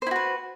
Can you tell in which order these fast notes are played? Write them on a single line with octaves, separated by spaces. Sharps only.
C5 E4 F#4 B4